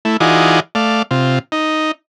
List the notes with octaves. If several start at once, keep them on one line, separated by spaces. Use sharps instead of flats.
A3 E4
E3 D#4 F4 F#4 G#4 D5
A3 D5 F5
C3 F4
D#4